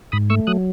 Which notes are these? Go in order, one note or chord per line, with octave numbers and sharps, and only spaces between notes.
G#2 B5 D#6
A3 C#6 E6
F#3 D#6 F#6